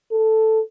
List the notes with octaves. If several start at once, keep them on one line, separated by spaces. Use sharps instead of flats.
A4